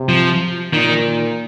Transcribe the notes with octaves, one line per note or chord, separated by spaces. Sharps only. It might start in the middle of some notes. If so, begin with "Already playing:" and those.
Already playing: C3
F3
A#2 D#3